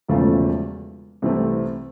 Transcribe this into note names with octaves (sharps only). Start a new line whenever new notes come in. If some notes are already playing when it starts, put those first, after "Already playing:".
E1 E2 C#3 F3 A3
C2 C3 E3 A3 C4